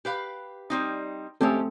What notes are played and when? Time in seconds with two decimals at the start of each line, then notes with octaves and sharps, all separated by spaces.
0.05 G4 B4 F5
0.70 G3 C4 D#4
1.41 G#3 A3 C4 C#4 G4 A4